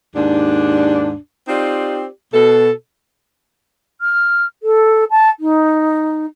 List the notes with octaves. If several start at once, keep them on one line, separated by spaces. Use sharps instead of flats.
D#2 G#2 D4
C4 D#4 F4 G4 D5
B2 A4
F6
A4
A5
D#4